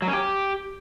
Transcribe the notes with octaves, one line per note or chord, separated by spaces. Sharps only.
F#3
C#4
G4